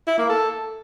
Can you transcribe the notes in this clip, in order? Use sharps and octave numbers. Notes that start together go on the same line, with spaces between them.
E4
A#3
A4